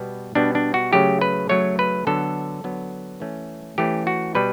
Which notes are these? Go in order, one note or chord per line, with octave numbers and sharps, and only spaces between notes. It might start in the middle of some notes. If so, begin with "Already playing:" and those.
Already playing: B2 G3 B3
B2 G3 B3 D4
D4
F#4
C#3 F#3 A3 G4
B4
C#3 F#3 A3 C#5
B4
D3 F#3 B3 A4
D3 F#3 B3
E3 A3 C#4
E3 A3 C#4 G4
F#4
B2 G3 B4